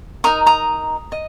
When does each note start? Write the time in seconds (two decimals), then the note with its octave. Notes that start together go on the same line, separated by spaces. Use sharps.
0.24 D#4 A#4 D#5 A#5 D#6
0.46 A#5 D#6
1.12 D#5